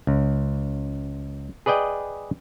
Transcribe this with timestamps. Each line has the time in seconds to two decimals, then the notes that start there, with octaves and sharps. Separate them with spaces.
0.07 C#2
1.66 G#4 B4 D5 D#5 G5